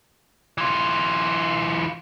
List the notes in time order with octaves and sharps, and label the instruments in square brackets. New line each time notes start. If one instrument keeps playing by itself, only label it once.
[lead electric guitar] E3 F4